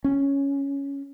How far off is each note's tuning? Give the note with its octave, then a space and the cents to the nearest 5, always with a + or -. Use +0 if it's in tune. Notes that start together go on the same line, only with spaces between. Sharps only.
C#4 +5